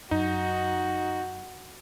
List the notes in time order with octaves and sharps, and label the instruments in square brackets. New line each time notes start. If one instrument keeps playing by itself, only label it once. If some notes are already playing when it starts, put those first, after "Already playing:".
[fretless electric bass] F#2 [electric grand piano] D#4 [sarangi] F#4